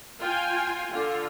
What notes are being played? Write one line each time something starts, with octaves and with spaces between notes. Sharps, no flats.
F4 G5 G#5
D3 F4